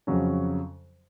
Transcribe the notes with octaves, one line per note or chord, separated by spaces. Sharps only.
F2 C#3 F#3 C#4